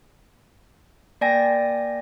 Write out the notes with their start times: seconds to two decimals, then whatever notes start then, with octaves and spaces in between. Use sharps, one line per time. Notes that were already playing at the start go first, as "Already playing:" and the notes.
1.21 A#3 D5 G5 G#5 A#6